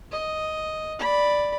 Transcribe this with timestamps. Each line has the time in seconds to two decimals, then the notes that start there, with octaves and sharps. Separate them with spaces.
0.12 D#5
0.99 D5 B5